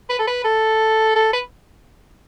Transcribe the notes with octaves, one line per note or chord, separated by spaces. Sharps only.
B4
A4
B4
A4
A4
B4